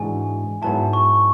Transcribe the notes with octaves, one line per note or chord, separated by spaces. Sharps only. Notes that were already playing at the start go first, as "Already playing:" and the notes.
Already playing: G#2 E3 G#3 D4 F#4 G#5
G#2 F#3 B3 E4 A5
C#6